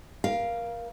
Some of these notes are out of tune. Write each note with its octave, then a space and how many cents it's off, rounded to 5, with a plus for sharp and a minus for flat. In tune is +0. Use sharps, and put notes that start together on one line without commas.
A#4 +25 F5 -5